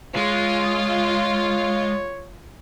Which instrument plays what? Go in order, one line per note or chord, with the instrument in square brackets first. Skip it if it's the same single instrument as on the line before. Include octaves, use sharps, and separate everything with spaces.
[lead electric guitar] G#3 [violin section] F4 [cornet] C#5